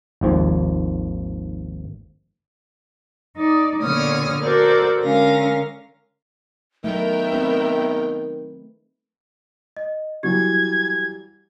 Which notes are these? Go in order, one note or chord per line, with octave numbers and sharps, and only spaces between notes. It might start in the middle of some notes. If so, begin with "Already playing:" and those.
G#1 D#2 F3
D#4 D5
A#2 D3 B3 C#5 D#6 F6
F#4 A4 A#4 C5 D5
D3 G#3 C#4 A#4 F5 A#6
D#3 F#3 A3 B3 A#4 E5 G5
A3 C4 B4
D#5
E3 F#3 G3 G4 G#6